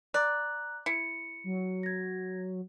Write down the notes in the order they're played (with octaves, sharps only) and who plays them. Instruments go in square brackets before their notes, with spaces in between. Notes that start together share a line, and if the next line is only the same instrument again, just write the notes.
[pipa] D5 [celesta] A#5 F#6
[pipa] E4 [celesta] C#7
[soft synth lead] F#3
[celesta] G#6 A#6